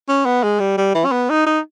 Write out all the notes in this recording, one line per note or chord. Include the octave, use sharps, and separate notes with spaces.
C#4
B3
G#3
G3
G3
E3
C#4
B3
D#4
D#4